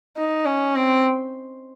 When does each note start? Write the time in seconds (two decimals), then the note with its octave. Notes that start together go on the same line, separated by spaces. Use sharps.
0.17 D#4
0.46 C#4
0.76 C4